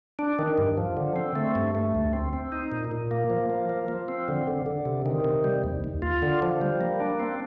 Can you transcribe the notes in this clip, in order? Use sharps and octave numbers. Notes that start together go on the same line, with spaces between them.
D4
D#3
G2
F3
D3
C4
A3
G2
A3
D2
C4
C4
D#4
A#2
A#2
A#3
F3
A#3
F3
F3
C4
D3
D3
D3
C3
D#3
C3
G3
D#2
D#2
F4
D3
F3
G3
A#3
D4
C4